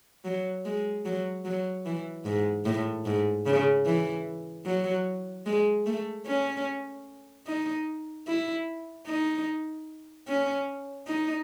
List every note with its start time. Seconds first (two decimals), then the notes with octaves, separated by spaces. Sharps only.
0.25 F#3
0.66 G#3
1.05 F#3
1.45 F#3
1.86 E3
2.25 G#2
2.65 A2
3.05 G#2
3.46 C#3
3.86 E3
4.66 F#3
5.46 G#3
5.86 A3
6.26 C#4
7.47 D#4
8.27 E4
9.07 D#4
10.28 C#4
11.08 D#4